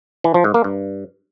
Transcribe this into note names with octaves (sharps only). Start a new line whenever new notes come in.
E3
F3
G#2
A#3
G2